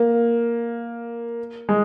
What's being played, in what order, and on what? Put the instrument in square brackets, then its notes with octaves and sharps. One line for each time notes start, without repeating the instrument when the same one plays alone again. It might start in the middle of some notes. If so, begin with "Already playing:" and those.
Already playing: [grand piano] A#3
G#3